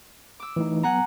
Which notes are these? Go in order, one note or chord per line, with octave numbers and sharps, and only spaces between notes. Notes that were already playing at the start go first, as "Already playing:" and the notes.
D6 E6
E3 A3 D#4
F#3 B3 F#5 G#5 A#5